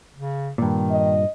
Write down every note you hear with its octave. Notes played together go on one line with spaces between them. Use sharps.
C#3
G2 A#2 D#3
D#5